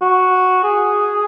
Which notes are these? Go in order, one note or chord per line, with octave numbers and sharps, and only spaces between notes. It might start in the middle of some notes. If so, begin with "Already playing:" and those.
F#4
G#4